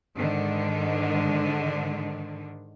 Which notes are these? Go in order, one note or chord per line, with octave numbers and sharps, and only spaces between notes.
G#2 D3 D#3